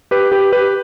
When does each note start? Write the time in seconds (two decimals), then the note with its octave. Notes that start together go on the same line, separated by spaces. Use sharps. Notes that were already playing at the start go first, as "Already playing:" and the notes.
0.11 G4 B4
0.32 G4 B4
0.52 G4 B4